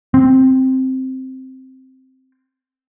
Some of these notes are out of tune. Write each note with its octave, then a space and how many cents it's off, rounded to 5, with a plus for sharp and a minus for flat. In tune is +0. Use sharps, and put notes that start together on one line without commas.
C4 +0